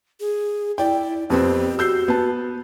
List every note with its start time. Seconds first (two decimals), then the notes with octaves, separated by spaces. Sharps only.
0.20 G#4
0.78 E4 D5 G5
1.30 F2 B3 C4 G4
1.79 F#4 E6 G6 C7
2.08 B3 A5